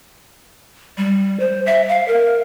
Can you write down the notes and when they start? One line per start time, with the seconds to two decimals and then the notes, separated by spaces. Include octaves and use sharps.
0.98 G3
1.40 C5
1.66 E5
1.89 F5
2.08 A#4